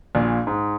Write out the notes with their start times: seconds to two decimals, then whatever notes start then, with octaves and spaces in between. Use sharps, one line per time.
0.15 A#1 A#2
0.47 G#2